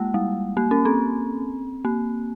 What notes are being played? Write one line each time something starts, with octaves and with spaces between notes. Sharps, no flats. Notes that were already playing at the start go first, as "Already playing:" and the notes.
Already playing: G#3 A#3
G3
A#3
C#4
C4
A#3